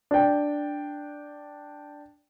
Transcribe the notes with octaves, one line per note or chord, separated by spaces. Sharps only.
D4 G5